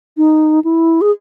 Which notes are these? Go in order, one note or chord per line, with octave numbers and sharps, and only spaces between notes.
D#4
E4
G#4